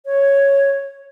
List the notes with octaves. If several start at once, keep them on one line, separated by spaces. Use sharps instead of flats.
C#5